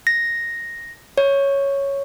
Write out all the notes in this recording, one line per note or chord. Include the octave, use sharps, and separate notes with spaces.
A#6
C#5